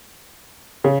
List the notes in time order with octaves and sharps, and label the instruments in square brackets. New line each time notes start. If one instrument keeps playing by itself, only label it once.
[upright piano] C#3